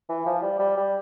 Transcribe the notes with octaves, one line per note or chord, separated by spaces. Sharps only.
E3
F3
G3
G3
G3